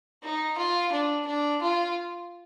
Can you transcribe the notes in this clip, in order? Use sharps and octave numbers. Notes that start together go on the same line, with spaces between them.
D#4
F4
D4
D4
F4